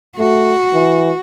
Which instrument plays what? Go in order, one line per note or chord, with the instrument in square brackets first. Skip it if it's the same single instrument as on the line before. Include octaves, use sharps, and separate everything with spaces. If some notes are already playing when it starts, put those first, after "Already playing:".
[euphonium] A3 [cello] F#4
[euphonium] E3